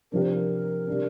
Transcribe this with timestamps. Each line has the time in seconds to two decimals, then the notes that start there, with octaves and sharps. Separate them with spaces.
0.12 C3 F3 D4 A#4
0.22 C5
0.33 A#4
0.87 C3 G3 D4